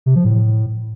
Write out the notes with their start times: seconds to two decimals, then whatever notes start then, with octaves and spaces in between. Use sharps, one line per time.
0.06 C3
0.15 F3
0.25 A2